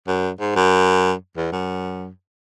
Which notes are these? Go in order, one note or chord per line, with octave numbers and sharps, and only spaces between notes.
F#2
G#2
F#2
E2
F#2